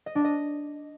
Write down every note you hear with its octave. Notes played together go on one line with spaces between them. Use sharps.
D#5
D4
D#5